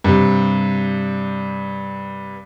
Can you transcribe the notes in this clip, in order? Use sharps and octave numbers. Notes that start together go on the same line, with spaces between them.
G2 C3